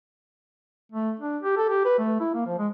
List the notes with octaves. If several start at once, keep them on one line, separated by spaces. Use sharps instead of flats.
A3
D4
G4
A4
G4
B4
A3
E4
A#3
F3
G#3